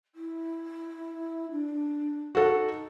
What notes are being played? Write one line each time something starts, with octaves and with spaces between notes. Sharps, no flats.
E4
D4
D#4 F#4 A4